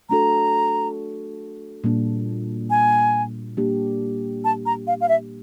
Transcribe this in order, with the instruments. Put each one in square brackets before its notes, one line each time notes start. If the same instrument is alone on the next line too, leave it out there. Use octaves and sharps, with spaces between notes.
[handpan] A3 D4 F#4 A4 [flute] A#5
[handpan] A#2 G3 A#3 D4
[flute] G#5
[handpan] G3 A#3 D4 G4
[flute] A5
A#5
F5
F5
E5